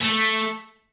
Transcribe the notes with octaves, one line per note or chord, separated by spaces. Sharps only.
A3